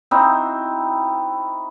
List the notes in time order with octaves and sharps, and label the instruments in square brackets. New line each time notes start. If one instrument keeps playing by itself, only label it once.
[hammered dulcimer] C4 D#4 E4 F#4